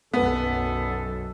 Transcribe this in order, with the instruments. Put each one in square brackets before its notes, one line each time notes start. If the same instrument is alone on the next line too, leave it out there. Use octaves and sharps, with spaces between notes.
[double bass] B1 F#2 [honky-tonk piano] B3 [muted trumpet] A4